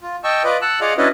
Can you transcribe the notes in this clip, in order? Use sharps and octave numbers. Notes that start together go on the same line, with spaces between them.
F4
D#5 G5 A5 C#6 E6
F4 B4 D5 D#5
F#5 A5 E6 F#6
F4 G#4 D5 D#5 F5 F#5
C#4 D4 E4 F#4 B4 D#5